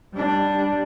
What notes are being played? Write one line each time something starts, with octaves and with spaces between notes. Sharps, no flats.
G3 D4